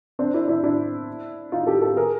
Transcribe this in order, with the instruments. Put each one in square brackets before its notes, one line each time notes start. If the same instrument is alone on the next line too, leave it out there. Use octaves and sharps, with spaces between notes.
[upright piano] C4 D4
D4 E4
D4 E4
D4 E4
D#4 F4
G4 A4
G4 A4
G#4 A#4